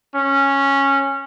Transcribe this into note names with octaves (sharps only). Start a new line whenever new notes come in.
C#4